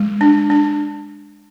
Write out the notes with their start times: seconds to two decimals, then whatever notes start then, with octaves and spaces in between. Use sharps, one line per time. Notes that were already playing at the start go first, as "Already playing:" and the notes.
Already playing: G#3
0.21 D4
0.50 D4